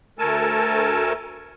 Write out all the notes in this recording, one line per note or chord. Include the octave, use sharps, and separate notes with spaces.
D2 A3 A4 A#4 G#5 A5